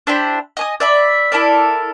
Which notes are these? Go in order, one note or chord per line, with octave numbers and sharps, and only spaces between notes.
D4 E4 G4 C5
D#5 G#5 D#6
D5 E5 B5
E4 A4 A#4 D5